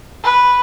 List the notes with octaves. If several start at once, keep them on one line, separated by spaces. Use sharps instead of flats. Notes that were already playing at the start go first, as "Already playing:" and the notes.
B4